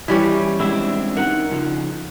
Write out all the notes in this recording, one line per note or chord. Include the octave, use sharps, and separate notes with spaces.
E3 G3 C#4
G#3 C4 D4 E4
D#4 A#4 F#5
C#3 F3 D#4